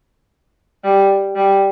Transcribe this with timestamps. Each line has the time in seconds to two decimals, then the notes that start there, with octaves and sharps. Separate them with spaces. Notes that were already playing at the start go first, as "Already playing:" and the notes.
0.84 G3
1.36 G3